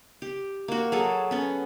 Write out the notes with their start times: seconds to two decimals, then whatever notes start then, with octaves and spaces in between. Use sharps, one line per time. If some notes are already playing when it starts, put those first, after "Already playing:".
0.22 G4
0.68 A#3 F#4
0.92 F#3 G#4 A4
1.31 B3 C#4